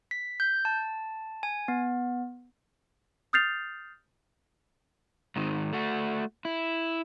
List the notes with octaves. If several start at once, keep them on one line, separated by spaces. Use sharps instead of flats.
B6
G6
A5
G#5
B3
D#6 F6 G6 A6 C7 F7
G#2 D#3
A3 F#4
E4